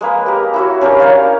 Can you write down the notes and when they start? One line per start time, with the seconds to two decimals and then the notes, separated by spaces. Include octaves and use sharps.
0.01 G#3 A#3 B4
0.26 G4 A#4
0.54 E4 F#4 C#5
0.81 C#4 D4 G4 A#4
1.00 C#5 F5